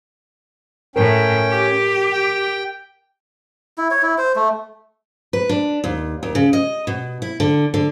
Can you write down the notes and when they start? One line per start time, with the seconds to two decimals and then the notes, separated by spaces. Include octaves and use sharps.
0.96 A2 C#4 A#4 G5
1.50 G4
2.12 G5
3.78 E4
3.91 C#5
4.03 E4
4.18 C5
4.36 A3
5.33 B4
5.49 D4
5.84 D#2
6.23 D#2
6.35 C#3
6.53 D#5
6.87 B2
7.22 E4
7.40 D3
7.74 D3